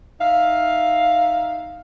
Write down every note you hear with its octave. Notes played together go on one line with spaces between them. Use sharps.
D#4 E5 F5